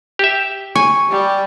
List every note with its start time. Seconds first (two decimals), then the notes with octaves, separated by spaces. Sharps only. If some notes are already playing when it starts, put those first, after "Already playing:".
0.19 G4 E5
0.76 G#5 C#6
1.11 G3